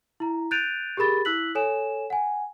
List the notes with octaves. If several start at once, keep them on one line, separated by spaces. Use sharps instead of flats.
E4 A#5
F#6 G6 A6 D7 D#7 F7
G4 G#4 A#4 B5 A6
E4 E6 F#6 B6 F#7
A4 C#5 G#5 E7
F#5 G#5